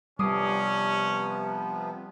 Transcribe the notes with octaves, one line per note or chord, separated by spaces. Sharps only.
C3 F3 G3 B3 C#4 D6 D#6 C7